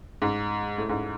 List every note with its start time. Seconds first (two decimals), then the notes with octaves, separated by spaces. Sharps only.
0.22 G#2
0.78 A2
0.89 G#2